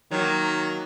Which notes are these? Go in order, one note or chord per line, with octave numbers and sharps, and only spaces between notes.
D#3 F#3 A#3